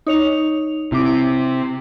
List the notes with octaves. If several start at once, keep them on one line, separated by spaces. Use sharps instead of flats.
D#4 C#5 F7
C3 E4 D6